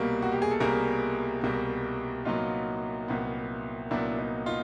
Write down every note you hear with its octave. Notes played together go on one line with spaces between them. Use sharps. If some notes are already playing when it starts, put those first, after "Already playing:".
Already playing: C2 B2 G3 A#3
F#4
G4
G#4
A4
C2 B2 G3 A#3 G#4 A#4
C2 B2 G3 A#3
C2 A#2 F#3 B3 D#4 F4
C2 A#2 F#3 B3
C2 A#2 F#3 B3 D4 E4
D#4
D#4 F4